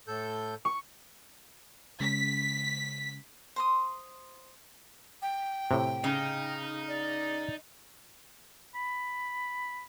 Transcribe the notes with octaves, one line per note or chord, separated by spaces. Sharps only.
A2 A4 G6
C#6
C#3 G#3 C#4 B6
C5 C6 D#6
G5
A2 C3
C#3 D#4
D5
B5